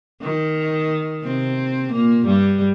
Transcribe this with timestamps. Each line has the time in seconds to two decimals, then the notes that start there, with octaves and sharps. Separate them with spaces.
0.22 D#3
1.24 C3 C4
1.92 A#2 A#3
2.26 G2 G3